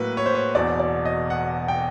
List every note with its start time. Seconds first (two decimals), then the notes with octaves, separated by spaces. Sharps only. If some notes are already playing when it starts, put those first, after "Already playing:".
Already playing: A2 F#3 A#3 B4
0.17 C#5
0.26 C5
0.35 C#5
0.55 E1 E2 B2 D5
0.79 D5
1.05 D#5
1.30 F#5
1.68 G5